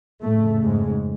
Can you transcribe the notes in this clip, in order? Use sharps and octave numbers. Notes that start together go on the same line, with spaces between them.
F2 A2 C#3 A3
G#2 G#3